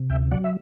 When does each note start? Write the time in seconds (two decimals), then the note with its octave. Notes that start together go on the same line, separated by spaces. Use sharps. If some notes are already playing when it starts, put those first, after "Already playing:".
Already playing: C3
0.10 D2 E5 G5
0.31 F#3 D5 F#5
0.44 E5